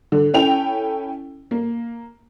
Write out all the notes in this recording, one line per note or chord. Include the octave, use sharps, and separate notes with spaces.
D3
C#4 E4 A4 G5 F7
A#3